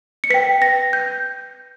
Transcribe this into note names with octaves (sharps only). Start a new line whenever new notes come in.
C#7
B4 G5 B6
A#6
G6